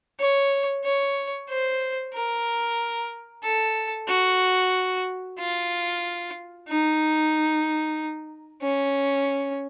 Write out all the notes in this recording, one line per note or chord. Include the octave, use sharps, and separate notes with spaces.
C#5
C#5
C5
A#4
A4
F#4
F4
D#4
C#4